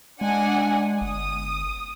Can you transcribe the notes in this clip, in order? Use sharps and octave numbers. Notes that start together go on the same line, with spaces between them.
G#3 D4 F#5 G#5
G1 D#6